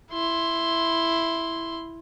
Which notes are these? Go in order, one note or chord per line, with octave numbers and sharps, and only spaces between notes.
E4 C6